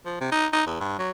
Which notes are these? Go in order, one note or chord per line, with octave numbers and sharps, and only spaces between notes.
F3
C3
D#4
D#4
E2
G2
F#3